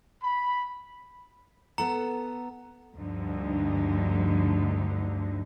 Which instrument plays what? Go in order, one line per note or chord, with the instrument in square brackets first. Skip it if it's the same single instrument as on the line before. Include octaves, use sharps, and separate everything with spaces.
[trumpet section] B5
[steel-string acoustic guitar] B3 A4 F#5 [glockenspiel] A#5
[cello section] D2 G2 D3 F3 D#4